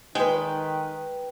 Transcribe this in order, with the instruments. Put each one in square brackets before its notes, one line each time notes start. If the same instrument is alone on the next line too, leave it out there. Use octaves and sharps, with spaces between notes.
[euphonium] D#3 [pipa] G#3 [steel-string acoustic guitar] B4 G5